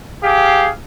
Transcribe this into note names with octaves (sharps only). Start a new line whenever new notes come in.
G4 G#4 F5